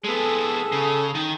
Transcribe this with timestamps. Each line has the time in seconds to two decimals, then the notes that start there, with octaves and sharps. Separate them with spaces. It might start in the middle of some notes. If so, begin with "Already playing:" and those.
0.04 G#3 B3 G#4 A4
0.72 C#3
1.15 D#3